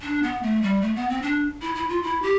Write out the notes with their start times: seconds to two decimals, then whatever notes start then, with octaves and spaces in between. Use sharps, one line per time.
0.02 D4
0.23 B3
0.42 A3
0.63 G3
0.82 A3
0.95 B3
1.09 C4
1.22 D4
1.62 E4
1.75 E4
1.89 F4
2.03 E4
2.22 G4